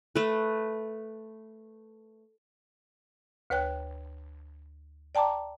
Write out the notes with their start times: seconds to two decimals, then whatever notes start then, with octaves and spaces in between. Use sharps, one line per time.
0.15 A3 B4
3.50 D2 B4 C#5 G5 F#6
5.15 D5 G5 A5 A#5 D6